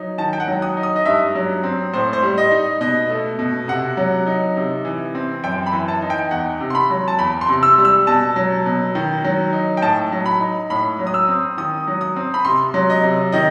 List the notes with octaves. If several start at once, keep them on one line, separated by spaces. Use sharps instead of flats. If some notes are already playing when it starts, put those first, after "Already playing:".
Already playing: F#3 D#4
D#3 A5
G5
F#5
F#3
D#6
D#4
D#6
D#5
G2 E5
F#3
C4
A2 C5
C5
G3
D#5
D#4
B2 D#5
A3
B2
C3 F#5
F#3
D#4
C3
E3
C4
F#2 G5
B5
E3
A5
D#4
G5
E2 F#5
C3
C6
B5
F#3
A5
E2 B5
C6
C3
E6
G3
E6
B2 A5
F#3
B2
D#3
F#3
D#4
G5
A2 A5
F#3
B5
D#4
A2 B5
F#3
D#6
E6
C4
D#3 D#6
F#3
D#6
C4
B5
C3 C6
F#3
D#5
C3
D#3 D#5